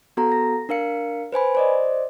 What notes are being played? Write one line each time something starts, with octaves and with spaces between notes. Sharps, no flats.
B3 F#4 A4 A#5
A#6
D4 A#4 F5 C#7
B4 C5 G#5 B5
C5 D5 D#5